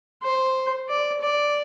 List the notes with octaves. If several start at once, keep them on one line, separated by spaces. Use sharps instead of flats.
C5
D5
D5